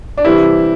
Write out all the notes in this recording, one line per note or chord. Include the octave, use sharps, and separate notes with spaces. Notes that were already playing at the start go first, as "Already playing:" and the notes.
D4
C3 E3 G3 E4